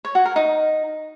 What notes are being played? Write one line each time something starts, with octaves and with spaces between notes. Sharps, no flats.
C#5
F#4
A#4
D#4